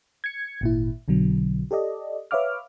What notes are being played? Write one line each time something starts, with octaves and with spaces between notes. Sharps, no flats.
G#6 C#7
G#1 A#2 E4
B1 B2 D3 F#3
G4 A4 D5 D#5
B4 C#5 E5 F5 D6 F6